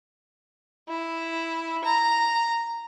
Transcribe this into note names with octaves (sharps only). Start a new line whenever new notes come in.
E4
A#5